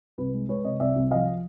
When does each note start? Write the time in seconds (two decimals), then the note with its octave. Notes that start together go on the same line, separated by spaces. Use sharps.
0.18 C2 B4
0.34 G#3
0.49 G#3 B4 C#5
0.64 C3 C#5 D#5
0.80 C2 D5 E5
0.96 C2
1.11 F3 D#5 F5